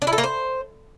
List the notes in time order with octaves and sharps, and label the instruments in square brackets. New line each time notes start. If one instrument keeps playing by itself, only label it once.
[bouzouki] D4
E4
A4
A#3
C5